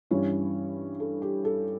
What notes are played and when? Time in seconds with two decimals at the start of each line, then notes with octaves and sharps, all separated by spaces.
0.11 G2 E3 G3 C#4 C#5
1.00 A4
1.22 G4
1.44 A4